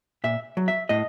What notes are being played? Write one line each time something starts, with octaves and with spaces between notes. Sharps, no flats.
A#2 E5
F#3
E5
A2 D#5